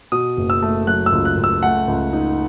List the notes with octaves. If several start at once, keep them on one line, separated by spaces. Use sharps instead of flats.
B2 D#6
F#1
E6
A3
F#3 F#6
E6
C#2
F#6
C#2
E6
A3 F#5
C#2
D#4